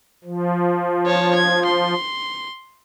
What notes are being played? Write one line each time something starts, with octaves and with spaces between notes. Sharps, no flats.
F3
C#5 A5
G#6
C6